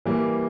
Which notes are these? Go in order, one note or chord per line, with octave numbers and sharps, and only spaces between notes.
E3 G3 A#3